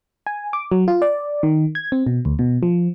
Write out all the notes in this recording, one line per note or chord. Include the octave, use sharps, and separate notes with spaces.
G#5
D6
F#3
F4
D5
D#3
G#6
C4
B2
D2
B2
F3